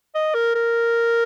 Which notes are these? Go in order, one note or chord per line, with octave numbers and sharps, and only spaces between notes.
D#5
A#4
A#4